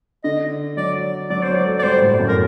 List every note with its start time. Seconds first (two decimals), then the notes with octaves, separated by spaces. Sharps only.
0.24 D3 D#5
0.77 F#3 D5
1.30 F#3 D5
1.43 C5
1.48 F#3
1.55 D5
1.66 A3
1.79 D5
1.83 G3 C5
2.01 A2
2.19 F#2
2.28 A#4